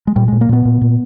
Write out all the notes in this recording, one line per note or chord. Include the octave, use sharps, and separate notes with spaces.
G#3
A#2 G3
A#2 G#3
A#3
A#2 B3
A#2
A#2